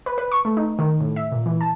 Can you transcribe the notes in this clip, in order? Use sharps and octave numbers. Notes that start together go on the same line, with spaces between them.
B4
B4
C#6
A3
D#4
D#3
A2
E5
A#2
E3
A5